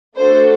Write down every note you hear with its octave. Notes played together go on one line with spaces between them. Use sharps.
A3 D4 F#4 A4 C5